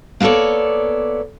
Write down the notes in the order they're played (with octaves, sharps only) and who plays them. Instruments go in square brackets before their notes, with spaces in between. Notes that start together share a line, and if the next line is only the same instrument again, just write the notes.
[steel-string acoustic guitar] A#3 B3 A4 C#5 D5